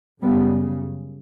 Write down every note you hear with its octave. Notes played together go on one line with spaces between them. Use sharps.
F#2 C#3 G3 B3